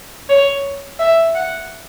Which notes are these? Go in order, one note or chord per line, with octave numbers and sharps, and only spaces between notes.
C#5
E5
F#5